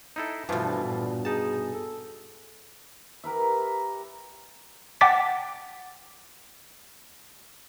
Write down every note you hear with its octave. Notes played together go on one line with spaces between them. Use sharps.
D#4 E4 A4
G2 B2 E3 F3 A3
D4
A#2
D#4 G#4 A5
A4
G4 A#4 B4 E5
F#5 G5 A5 D6 A6 B6